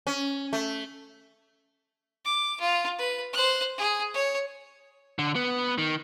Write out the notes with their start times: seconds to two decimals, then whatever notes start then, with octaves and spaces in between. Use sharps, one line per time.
0.07 C#4
0.53 A3
2.25 D6
2.60 F4
2.98 B4
3.33 C5 F#6
3.78 G#4
4.14 C#5
5.19 D3
5.35 B3
5.78 D#3